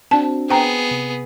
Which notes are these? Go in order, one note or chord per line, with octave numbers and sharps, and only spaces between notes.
C4 D4 F#4 A5
B3 G#4 C5 G5 A#5
C3